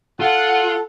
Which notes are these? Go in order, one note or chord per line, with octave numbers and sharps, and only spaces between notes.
F4 A4 F#5